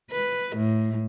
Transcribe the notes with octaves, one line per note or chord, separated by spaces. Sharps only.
B4
A2